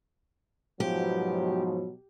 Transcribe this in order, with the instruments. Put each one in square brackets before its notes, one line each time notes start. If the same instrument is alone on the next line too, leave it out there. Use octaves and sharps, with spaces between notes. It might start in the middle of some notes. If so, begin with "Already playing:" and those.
[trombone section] G#2 F3 [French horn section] B2 F#3 [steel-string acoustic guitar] G4